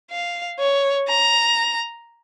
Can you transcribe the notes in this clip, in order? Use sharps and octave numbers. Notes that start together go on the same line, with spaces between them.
F5
C#5
A#5